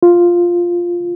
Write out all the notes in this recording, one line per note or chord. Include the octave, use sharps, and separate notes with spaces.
F4